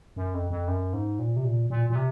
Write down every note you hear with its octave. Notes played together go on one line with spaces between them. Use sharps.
F#2
F2
F2
F#2
G#2
A#2
C3
A#2
A#2
A#2
C3